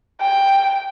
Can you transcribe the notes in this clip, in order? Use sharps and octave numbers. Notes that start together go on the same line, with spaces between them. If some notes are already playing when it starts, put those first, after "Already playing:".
G5